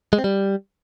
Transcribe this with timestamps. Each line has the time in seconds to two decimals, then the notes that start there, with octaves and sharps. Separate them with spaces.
0.13 G#3
0.18 C4
0.24 G3